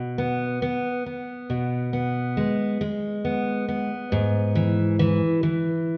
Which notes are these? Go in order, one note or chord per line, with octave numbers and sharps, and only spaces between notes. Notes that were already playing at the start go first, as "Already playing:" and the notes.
Already playing: B2
B3
B3
B3
B2
B3
G#3
G#3
B3
B3
G#2
E3
E3
E3